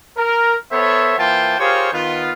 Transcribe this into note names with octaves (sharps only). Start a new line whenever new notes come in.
A#4
B3 A4 C5 C#5 E5
E3 A#3 F4 C5 G5 A5
F4 G4 G#4 A#4 C5 C#5
D#3 B3 F4